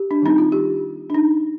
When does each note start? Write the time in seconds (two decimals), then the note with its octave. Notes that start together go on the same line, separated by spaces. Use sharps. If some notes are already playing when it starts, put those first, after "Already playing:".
Already playing: G4
0.11 D4
0.22 D#3 G3 C4 D#4
0.38 F4
0.52 G4
1.10 D4
1.14 D#4